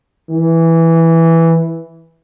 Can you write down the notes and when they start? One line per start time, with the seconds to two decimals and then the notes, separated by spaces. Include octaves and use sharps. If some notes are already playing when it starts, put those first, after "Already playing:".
0.30 E3